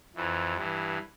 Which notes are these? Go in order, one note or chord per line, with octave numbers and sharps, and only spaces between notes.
F2 E3
G2 E3